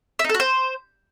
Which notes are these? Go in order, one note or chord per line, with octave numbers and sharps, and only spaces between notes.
E5
D#4
A4
F#4
C5